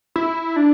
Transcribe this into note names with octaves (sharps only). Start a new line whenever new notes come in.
E4
D4